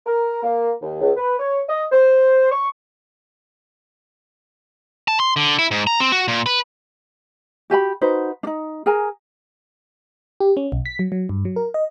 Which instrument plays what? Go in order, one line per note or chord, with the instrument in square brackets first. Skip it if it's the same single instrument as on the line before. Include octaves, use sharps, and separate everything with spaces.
[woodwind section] A#4
A#3
D#2
C#2
B4
C#5
D#5
C5
C#6
[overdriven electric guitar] A5
C6
D3
E4
G#2
A#5
C4
F#4
A#2
B4
[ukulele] F#4 G4 G#5 B5
D#4 F#4 B4 C5
D4 D#4
G#4 A#4 G#5 A#5
[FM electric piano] G4
C#4
B1
B6
F#3
F#3
G2
F#3
A#4
D#5